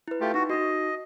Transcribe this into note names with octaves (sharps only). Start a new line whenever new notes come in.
E4 B4
A3 F4 G4
D#4 F#4
D#4 F#4 D#5